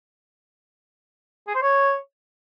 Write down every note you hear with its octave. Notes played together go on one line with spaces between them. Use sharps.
G#4
C5
C#5